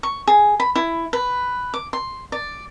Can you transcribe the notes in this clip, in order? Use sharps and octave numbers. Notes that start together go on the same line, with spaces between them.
C#6
G#4
B5
E4
B4
D6
C6
D5